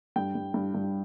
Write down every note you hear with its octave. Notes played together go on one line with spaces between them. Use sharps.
G2 G5
G2
G2
G2